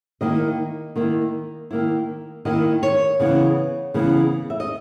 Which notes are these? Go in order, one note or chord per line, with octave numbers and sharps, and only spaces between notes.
D#3 A#3 E4 D#5
D#3 A#3 E4
D#3 A#3 E4
D#3 A#3 E4 D#5
C#5
C#3 E3 B3
C#3 E3 B3
E5
D#5